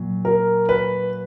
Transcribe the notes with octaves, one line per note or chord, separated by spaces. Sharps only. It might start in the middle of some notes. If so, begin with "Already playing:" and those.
Already playing: A#2 F#3
A#4
B4